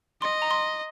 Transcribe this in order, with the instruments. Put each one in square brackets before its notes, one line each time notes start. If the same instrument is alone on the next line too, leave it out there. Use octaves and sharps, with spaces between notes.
[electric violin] D#5 [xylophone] C6
[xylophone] A#5
C6